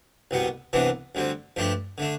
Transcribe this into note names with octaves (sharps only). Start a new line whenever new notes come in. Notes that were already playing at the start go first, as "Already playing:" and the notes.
C2 B2 G3 B3
C2 C3 E3 B3 D4
D2 D3 G3 C4
G2 F3 A3 D4 G4
D3 A3 D4